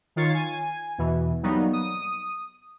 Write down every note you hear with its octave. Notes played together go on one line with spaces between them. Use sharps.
D#3 F4 C#5 A6 C7
G#5
E2 B2 E3
F#3 G3 A#3 B3 D#4
D#6